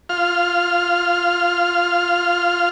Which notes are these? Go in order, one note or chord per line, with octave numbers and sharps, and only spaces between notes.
F4 F6